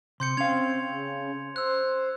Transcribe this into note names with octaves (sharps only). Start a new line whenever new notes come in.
C3 C6 G6 C#7
C4 C#4 F5 G#6 F7
C#3
C5 E6 F#6